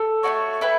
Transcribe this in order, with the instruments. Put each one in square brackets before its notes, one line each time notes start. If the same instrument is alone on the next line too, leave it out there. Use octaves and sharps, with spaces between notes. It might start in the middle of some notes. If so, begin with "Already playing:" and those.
Already playing: [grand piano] A4
[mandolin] A3 D4 F#4 C#5
E4 B4 E5 G5